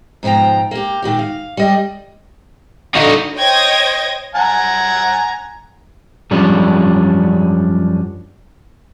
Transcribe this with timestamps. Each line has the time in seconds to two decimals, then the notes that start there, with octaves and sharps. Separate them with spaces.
0.23 G#2 B2 F3 G5 A#5
0.71 A#3 G4
1.02 A#2 D#3 F#4 G4
1.19 F5
1.57 G3 D#5 G5
2.95 D3 D#4 F#4
3.36 C5 C#5 D#5 G5 G#6 A#6
4.35 F#5 G#5 A#5
6.31 F#2 F3 G3 C#4 D4